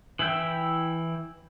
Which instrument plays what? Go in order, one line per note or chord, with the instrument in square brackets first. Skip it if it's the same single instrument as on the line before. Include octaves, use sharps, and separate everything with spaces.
[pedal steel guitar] E3 E4 E5 G5